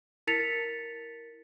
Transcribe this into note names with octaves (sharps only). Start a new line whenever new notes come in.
E4 A#4 A6 B6 C#7 F7